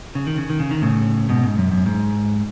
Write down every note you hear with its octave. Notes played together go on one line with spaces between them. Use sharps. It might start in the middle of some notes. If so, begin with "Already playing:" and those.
C#3
D#3
C#3
D#3
C#3
D#3
A2 C#3
G#2 B2
G#2
F#2
F#2
G#2